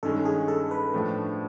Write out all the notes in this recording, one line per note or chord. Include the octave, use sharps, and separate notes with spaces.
G2 D#3 G#3 C#4 A4
G#4
A4
B4
A2 F3 A3 D4